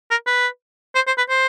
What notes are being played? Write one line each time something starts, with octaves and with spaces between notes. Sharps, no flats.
A#4
B4
C5
C5
B4
C5